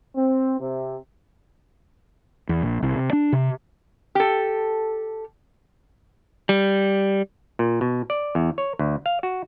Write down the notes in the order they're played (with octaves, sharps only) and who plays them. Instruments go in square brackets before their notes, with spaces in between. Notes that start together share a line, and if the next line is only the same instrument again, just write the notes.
[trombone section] C4
C3
[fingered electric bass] E2
A#1
C2
C3
D4
C3
[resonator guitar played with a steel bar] G4 A4
[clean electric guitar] G3
[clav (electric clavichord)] A#2
B2
D5
E2
C#5
D2
F5
F#4